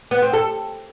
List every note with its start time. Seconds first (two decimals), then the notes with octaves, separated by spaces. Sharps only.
0.11 B3
0.22 C4
0.33 A4